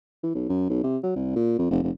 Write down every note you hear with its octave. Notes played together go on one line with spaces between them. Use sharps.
E3
B1
F#2
B1
C3
F#3
C2
A#2
F2
F1
F1